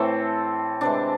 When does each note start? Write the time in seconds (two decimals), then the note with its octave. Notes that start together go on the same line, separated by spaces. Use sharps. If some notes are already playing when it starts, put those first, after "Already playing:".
Already playing: A2 E3 A3 C4 A4
0.81 C3 E3 G#3 D4